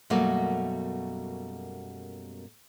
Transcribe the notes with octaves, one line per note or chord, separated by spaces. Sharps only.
F#2 B2 G3 A3 A#3 F#4